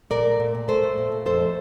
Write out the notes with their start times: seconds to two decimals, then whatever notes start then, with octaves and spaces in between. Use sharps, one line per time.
0.10 A#2 A#4 D5
0.25 A3
0.40 A#2
0.55 A#2
0.68 A3 A4 C5
0.83 A3
0.98 A#2
1.12 A#2
1.26 F2 A4 C5
1.40 A3